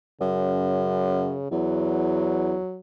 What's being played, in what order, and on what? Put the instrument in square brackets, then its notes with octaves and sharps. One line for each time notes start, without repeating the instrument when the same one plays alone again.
[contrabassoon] F#2 [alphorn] C#3
[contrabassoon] E2 [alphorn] F#3